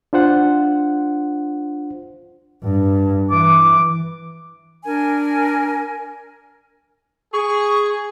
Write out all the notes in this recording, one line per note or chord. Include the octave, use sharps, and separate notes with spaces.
D4 F4 C5 F#5
G2
E3 D6
D4 A#4 G#5
G#4 C#6